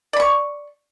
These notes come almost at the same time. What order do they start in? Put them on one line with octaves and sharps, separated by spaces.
D5 B5 C#6